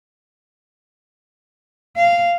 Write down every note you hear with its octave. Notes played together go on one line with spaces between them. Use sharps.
F5